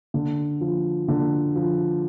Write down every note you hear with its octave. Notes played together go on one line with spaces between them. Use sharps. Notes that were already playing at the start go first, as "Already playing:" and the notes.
D3
F3
D3
F3